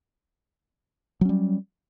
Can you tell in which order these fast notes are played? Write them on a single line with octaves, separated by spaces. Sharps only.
F#3 C#4 G3